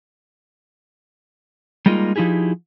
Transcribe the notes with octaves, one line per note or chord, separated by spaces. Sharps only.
G3 G#3 A#3 D#4 F4
F3 D#4 E4 G4 G#4